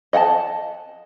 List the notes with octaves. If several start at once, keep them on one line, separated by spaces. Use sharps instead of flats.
D#5 F#5 G5 A5